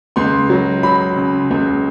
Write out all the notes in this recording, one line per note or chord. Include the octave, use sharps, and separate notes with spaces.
C#2 C6
F#3
F#3 B5
C#3
C#2